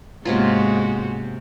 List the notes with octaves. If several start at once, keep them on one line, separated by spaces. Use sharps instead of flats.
G#2 C3 G#3 A#3 B3 C#4 F4 F#4